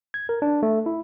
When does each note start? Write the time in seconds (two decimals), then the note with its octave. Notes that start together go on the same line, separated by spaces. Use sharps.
0.14 G#6
0.29 A#4
0.42 D4
0.63 A3
0.86 E4